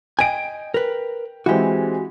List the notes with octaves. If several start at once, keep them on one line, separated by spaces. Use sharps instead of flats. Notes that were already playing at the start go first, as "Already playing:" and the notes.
D#5 G5 G#5 D7
A#4 B4
E3 G#3 C4 F#4 G4